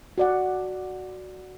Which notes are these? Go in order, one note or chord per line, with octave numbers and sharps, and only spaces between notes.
F#4 D5 F#5